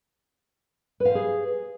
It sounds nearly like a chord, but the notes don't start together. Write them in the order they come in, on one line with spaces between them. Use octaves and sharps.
B4 F5 C5 G#4